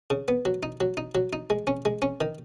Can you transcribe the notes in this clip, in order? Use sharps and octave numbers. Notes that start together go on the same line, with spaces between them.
C#3
B3
F#3
D#4
F#3
D#4
F#3
D#4
G#3
C#4
G#3
C#4
D#3